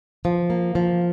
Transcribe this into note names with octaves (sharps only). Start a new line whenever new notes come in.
F3
A#3
F3